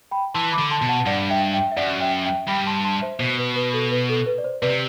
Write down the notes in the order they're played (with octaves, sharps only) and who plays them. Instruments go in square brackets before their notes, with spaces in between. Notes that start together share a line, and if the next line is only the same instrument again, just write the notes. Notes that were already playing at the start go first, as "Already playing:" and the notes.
[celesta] G5 B5
[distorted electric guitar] E3 [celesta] A5 C6
[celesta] B5 D6
[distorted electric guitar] D3
[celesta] A5 C6
[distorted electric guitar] B2
[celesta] F#5 A5
[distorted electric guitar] G2 [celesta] D5 F#5
[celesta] E5 G5
E5 G5
E5
[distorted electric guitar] F#2 [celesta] D5 F#5
[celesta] E5 G5
E5 G5
[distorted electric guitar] G2 [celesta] G5 B5
[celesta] A5 C6
A5 C6
C5 E5
[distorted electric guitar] B2 [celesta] C5
[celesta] B4
B4
A4
B4
A4
B4
D5
C5
[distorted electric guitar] C3 [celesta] B4 D5